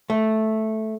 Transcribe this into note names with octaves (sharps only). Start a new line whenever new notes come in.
A3